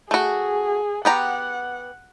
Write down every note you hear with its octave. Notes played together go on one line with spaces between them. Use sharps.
A3 F#4 G#4
B3 G4 F#5 A#5